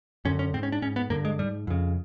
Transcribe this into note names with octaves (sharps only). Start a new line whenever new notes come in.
F#2 D3 C#4
C#4
G#2 C4
C#4
D4
G#2 C#4
B3
G2 D3 A#3
G#3
G#2 G3
F2 C#3